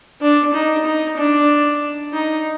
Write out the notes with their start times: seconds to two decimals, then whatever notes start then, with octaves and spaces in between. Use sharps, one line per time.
0.22 D4
0.54 D#4
0.85 D#4
1.17 D4
2.13 D#4